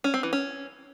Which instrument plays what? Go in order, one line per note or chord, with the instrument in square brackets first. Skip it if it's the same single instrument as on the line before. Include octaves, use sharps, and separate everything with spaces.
[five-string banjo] C#4
C4
E3
C#4